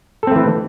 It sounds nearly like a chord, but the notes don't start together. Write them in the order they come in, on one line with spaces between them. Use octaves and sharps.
A4 C4 A3 E3